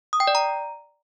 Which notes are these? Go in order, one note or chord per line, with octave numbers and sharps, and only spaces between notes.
D#6
G5
D5
A#5